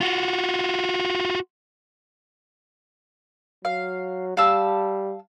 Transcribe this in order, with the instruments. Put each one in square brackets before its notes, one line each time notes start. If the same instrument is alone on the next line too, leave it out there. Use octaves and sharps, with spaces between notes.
[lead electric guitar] F4 F#4
[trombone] F#3 [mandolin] F5
[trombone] G3 [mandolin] F5 A5 E6